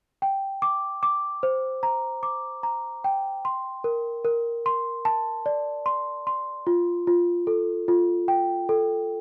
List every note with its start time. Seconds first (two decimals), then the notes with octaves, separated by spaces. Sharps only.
0.22 G5
0.62 D6
1.03 D6
1.43 C5
1.83 A#5
2.23 D6
2.63 A#5
3.04 G5
3.45 C6
3.84 A#4
4.25 A#4
4.66 C6
5.05 A5
5.46 D5
5.86 C6
6.27 C6
6.67 F4
7.07 F4
7.47 A4
7.88 F4
8.28 G5
8.69 A4